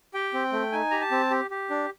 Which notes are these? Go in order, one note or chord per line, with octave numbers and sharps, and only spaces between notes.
G4 G5
C4
A3
D#4 G#5
G4 A#5
A5
C4
G4
G4
D4